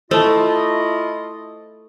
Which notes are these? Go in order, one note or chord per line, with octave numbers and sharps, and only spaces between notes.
A3 E4 F4 C5 D#5 A5